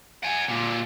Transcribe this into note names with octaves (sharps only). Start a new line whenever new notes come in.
F#5 G#5
A#2 D3